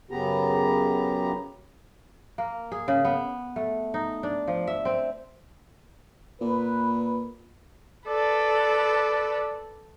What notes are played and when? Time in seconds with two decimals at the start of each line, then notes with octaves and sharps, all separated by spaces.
0.11 F#2 C#3 B3 G4 A#5
2.38 A#3
2.72 G#4
2.88 C#3
3.05 B3
3.56 A3
3.94 D#4
4.23 D4
4.48 F3
4.67 E5
4.85 C4
6.41 A#2 B4
8.07 A4 B4 D5